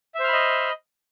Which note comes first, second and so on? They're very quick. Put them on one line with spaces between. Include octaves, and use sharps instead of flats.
E5 C5 F6 B5 D#5